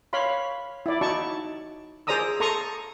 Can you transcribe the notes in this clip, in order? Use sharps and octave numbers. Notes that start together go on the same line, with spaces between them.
C#5 F5 B5 C6
E4 D5
D#4 F#4 D5 A5 C#6
G#4 C5 D5 A#5 D#6 E6
A4 A#5 C6 C#6 D#6